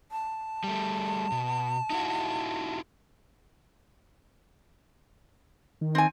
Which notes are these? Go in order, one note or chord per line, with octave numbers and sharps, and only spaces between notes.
A5
G3 A3
B2
D#4 E4 F#4
D#3
C4 G#5